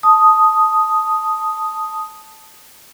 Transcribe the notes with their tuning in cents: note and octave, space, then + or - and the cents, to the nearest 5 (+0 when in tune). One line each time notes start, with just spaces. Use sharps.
A5 -5 D#6 +0